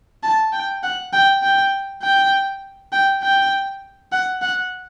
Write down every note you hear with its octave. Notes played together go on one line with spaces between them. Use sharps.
A5
G5
F#5
G5
G5
G5
G5
G5
F#5
F#5